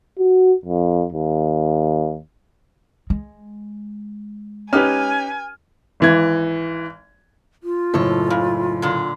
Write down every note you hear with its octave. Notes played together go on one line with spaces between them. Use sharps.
F#4
F2
D#2
G#3
C#4 D#4 G4 B4 G#5 F6
G#1 E3 G#6
F4
F#1 A2 A4 C#5
C#3
A#2 D3